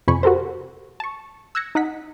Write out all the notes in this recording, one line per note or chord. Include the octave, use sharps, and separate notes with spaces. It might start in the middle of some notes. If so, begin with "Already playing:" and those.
F2 C3 G#5 B5 C#6
F#4 G4 A4 A#4 C5
A5 C#6
E6 F#6 G#6 A#6 C#7
D#4 D#5 F#5 B6